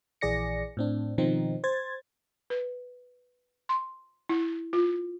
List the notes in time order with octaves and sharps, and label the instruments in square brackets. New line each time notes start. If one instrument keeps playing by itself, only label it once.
[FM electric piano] A#1 E3 G#4 D5 A#6 C#7
A2 C4 D4
B2 D#3 F3 C4 D#4
C5 G#6 A6
[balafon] B4
C6
E4
F4